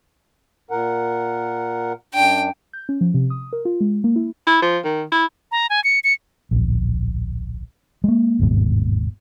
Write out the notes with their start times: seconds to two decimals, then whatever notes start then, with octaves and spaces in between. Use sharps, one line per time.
0.71 A#2 A#4 F#5
2.14 F#2 D4 G5
2.73 G6
2.89 C#4
3.01 F3
3.14 C3
3.30 D#6
3.53 A#4
3.65 F4
3.81 G#3
4.04 A#3
4.16 E4
4.47 E4
4.62 F3
4.84 D#3
5.12 E4
5.52 A#5
5.70 G#5
5.84 C#7
6.04 C#7
6.51 D1 A#1
8.04 G#3 A#3
8.39 G1 D#2 G#2 B2